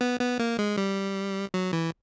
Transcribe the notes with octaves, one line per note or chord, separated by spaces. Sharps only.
B3
B3
A#3
G#3
G3
F#3
E3